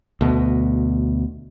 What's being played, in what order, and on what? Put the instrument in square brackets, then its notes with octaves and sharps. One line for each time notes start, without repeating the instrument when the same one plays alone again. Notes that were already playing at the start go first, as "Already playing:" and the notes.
[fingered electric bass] D2 B2